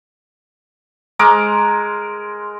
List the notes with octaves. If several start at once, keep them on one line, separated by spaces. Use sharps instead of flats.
G#3 A#4 D6